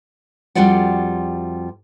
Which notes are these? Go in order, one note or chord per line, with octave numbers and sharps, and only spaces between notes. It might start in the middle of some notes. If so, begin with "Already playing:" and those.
F2 G3 F4 F#4 D5 F#5